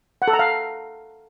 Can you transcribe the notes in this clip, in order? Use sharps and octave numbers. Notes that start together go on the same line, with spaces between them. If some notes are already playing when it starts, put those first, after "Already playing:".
F#5
A4
A#5
F5